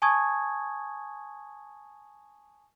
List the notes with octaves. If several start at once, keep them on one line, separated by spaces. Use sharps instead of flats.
G#5 A5 C#6 D#6 G#6